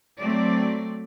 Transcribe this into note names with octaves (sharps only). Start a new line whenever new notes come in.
F#3 A3 C4 D5